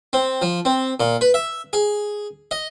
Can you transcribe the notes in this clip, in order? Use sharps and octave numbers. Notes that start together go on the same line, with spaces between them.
C4
F3
C4
A#2
B4
E5
G#4
D#5